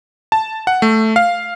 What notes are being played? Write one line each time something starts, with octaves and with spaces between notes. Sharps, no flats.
A5
F#5
A3
F5